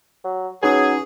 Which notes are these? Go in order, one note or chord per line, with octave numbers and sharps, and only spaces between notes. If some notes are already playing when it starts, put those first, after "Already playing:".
F#3
F#3 C#4 D#4 G#4 B4